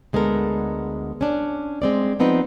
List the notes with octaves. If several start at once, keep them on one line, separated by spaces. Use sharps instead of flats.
D2 G#3 B3 A4 A#4
C#4 D4
G#3 C4 D5
F3 B3 C4 D#4 B4